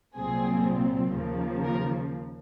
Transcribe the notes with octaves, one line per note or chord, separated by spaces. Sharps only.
C2 A#2 F#3 C4 G#4
D#2 C#3 F3 A#3
A#4